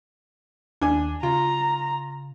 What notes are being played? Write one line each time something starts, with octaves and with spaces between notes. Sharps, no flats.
D#2 D4 G#5
C#3 F4 A#5